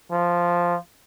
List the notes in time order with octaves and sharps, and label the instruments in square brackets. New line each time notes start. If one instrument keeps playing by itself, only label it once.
[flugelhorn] F3